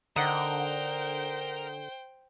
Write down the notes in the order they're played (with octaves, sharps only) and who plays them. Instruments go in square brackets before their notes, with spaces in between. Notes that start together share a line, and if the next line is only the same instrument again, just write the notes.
[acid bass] D3 [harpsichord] D#4 F#5 [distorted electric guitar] A#4 [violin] C5 G5